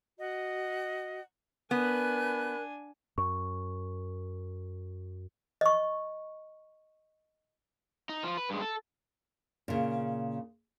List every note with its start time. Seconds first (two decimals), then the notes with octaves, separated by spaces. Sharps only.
0.19 F#4 D#5 F#5
1.71 B3 D4 A#4 B4 G#5 F#6
3.18 F#2 C#6
5.61 D#5 C#6
8.09 D#4
8.23 F3 F4
8.37 B4
8.50 G2 G#3
8.61 A4
9.68 A#2 C#3